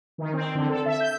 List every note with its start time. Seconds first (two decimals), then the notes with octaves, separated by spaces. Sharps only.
0.18 D#3
0.34 C4
0.55 D3
0.69 A4
0.86 E5
1.00 G6